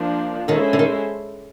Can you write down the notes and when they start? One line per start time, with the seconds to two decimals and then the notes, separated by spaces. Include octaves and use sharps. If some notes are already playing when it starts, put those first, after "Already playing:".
Already playing: F3 A#3 D4
0.48 D#2 D#3 G#3 C#4 E4 A4 C5
0.73 D3
0.79 D#3